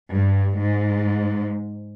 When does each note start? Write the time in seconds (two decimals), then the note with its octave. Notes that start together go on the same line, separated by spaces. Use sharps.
0.13 G2
0.61 G#2